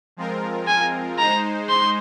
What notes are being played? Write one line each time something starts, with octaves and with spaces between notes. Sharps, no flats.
F3 G#3 C4 F4 A#4
G#5
G#3 D#4 C5 A#5
C6